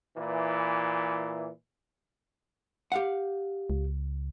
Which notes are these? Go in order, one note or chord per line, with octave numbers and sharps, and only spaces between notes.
A#2 E3
G4 F5 F#5
C#2